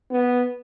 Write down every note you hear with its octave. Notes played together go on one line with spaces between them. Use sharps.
B3